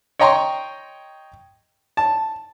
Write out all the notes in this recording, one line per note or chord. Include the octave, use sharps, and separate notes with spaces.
C#5 D#5 G5 A#5 C6 C#6
A5